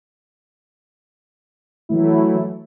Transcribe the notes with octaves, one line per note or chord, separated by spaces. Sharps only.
E3 F#3 A3 E4